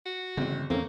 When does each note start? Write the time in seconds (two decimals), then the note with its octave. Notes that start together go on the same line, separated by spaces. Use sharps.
0.06 F#4
0.37 G1 C#3 E3 G#3 C4
0.70 E2 A3 A#3 C4 C#4